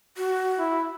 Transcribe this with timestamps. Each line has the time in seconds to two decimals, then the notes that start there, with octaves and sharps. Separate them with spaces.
0.17 F#4
0.59 E4